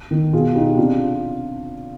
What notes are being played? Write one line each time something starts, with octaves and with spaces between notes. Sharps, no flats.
D#3
B2 F4 G#4
D#4 G4
C3 D4 F4